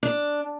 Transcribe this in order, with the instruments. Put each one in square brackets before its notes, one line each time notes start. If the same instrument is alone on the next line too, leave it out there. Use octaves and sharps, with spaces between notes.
[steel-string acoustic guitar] D4